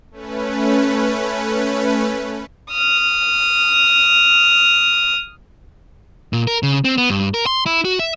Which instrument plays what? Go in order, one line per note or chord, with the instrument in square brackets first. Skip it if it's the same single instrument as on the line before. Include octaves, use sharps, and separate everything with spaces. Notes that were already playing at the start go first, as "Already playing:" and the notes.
[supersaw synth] A3 C#4 B4
[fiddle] D#6 F6
[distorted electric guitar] A#2
A#4
C#3
C4
B3
G2
A#4
C6
E4
F#4
E5